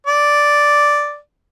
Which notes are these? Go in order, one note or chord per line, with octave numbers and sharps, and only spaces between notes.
D5